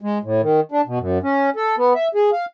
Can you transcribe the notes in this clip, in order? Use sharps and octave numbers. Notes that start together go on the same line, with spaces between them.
G#3
A2
D#3
D4
B2
F#2
C#4
A4
B3
E5
G#4
F5